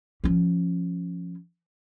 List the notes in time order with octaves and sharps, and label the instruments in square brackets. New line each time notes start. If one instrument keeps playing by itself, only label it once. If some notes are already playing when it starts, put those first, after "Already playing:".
[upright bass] F3 C#4